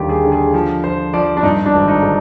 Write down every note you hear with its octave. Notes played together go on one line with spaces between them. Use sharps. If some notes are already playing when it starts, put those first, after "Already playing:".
Already playing: D#2 D3 D#3 G3 G4
G#4
D3
G#4
F3
F3 C5
F3 D5
D4
G2 D#4
D4
G#1
D#4
D3